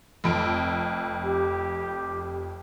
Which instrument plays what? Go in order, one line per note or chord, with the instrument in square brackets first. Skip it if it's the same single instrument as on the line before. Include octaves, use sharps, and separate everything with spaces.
[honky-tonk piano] F1 F2 D7
[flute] G4